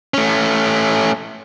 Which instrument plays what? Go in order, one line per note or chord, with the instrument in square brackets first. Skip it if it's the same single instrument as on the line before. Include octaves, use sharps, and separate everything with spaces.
[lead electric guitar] A3 C#4